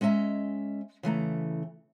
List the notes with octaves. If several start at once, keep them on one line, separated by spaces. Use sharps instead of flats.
G#3 C#4 D#5 E5 A#5
C#3 E3 A3 A#5